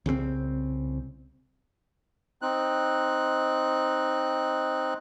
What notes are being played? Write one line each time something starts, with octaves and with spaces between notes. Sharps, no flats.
C2 C#3 F#3 C4
C4 D#4 F#6